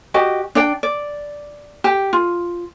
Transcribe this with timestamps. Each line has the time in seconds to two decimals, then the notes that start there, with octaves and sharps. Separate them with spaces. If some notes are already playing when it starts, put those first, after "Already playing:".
0.14 F#4 G4 D#5
0.55 D4 D5 G5
0.83 D5
1.84 G4
2.13 F4